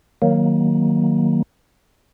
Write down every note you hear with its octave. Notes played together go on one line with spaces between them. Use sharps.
D#3 F#3 A#3